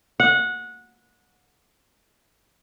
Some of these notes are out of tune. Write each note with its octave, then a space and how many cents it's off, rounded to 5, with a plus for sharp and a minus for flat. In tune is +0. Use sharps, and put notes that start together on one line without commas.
F#5 -20